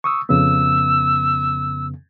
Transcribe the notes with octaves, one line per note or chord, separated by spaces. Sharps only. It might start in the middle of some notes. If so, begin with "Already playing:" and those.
C#6 D#6 E6
F2 C#3 B3 E6